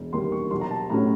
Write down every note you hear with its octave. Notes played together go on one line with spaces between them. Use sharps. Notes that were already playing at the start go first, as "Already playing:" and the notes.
Already playing: E1
D#2 D#3 G3 A#3 C6
C#6
B1 C6
A#5
A5
A2 F#3 A3 C#4 A#5